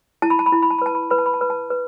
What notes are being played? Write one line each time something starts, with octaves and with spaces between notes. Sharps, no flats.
E4 A5
B5
A5
B5
E4 A5
B5
A5
B5
B4 A5
B5
A5
B4 B5
A5
B5
A5
B4 B5
A5
B4